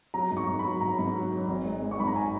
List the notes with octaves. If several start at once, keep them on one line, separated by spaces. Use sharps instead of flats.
F#3 A#5
G#2
C#6
G#2
B5
F#3
G#2 A#5
G#2
F#3
F#3
G#1
G#3
G#3
C#6
G#2 B5
A#5
G#5